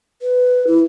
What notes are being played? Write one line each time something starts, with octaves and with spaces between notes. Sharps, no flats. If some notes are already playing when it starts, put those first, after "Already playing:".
B4
E4